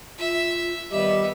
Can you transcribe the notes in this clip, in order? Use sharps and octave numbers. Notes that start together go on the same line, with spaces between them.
F4 E5
D#3 G3 B3 G4 D#5 E5